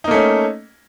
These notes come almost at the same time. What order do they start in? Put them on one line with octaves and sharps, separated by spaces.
D#4 A#3 A3 C#4